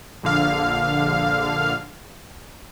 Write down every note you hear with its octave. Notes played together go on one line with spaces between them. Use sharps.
A#1 D3 F5